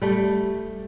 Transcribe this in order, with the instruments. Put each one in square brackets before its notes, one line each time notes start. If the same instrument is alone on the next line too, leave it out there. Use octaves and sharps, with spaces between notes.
[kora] G3 A3